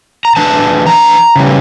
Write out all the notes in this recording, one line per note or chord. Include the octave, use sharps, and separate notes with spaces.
A#5
E3 A3 D4 A5
A#5
C#3 E3 G3